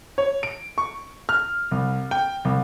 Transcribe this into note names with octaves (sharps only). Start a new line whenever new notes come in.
C#5
D7
C#6
F6
C2
G5
C2